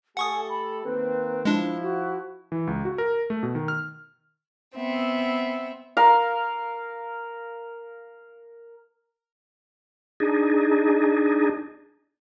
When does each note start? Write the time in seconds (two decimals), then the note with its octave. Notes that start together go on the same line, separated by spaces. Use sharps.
0.17 A3 G4 A4 F#5 G#5 C#6 D#6
0.50 B5
0.84 D#3 A#3 C4 B4
1.45 F3 G#3 D4 E4
1.82 F#4
2.52 E3
2.67 C#2
2.85 F#4
2.98 A#4
3.30 A3
3.43 B2
3.55 D#3
3.68 F6
4.75 B3 C4 E5
5.97 A#4 F5
10.20 D4 D#4 G#4